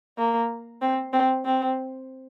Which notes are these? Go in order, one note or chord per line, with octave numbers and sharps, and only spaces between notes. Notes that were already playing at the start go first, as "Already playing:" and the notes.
A#3
C4
C4
C4